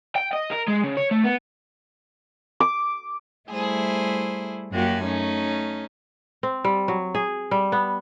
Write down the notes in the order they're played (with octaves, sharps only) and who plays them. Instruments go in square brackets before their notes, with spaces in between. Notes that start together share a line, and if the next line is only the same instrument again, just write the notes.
[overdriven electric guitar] G5
D#5
A#4
G#3
C#3
C#5
A3
B3
[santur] D6
[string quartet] G3 A3 E4 G#4 C5
F#2 A#3 F#4 G4 G#5
A3 C#4 D#4
[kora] C4
G3
F#3
G#4
G3
B3